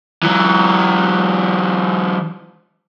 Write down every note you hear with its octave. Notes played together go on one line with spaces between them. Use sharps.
E3 F#3